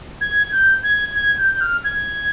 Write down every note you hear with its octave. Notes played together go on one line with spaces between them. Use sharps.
G#6
G6
G#6
G#6
G6
G6
F6
G#6